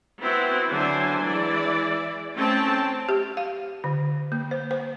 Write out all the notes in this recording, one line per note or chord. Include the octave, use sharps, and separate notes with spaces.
B3 C4 E4 F#4
D3 F#3 D4 E4 C5 G#5
E3 G#3 E4 D5
A3 C4 C#4 G5 A5
G4
F5
D3
A#3
C5
C5